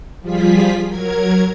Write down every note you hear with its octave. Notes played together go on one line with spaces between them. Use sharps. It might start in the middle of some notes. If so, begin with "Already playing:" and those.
F3 G3 F4 G#4 B6
F#3 A#4 G#6